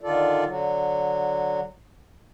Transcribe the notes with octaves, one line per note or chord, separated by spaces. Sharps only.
D3 D#3 F4 A4 D5
D3 F#3